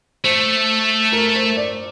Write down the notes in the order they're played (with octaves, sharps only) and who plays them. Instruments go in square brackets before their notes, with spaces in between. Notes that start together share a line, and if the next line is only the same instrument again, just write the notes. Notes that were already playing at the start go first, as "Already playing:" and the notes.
[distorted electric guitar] A3 [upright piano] C5
[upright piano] A#4
C5
D5